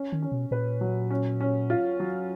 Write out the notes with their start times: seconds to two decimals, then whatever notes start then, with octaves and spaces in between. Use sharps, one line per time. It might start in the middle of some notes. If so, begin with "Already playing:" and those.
Already playing: C#4
0.12 D#3
0.22 C#4
0.32 B2
0.51 A#2 B4
0.81 F#3
1.10 C#4
1.41 C#4
1.70 F4
2.00 F#3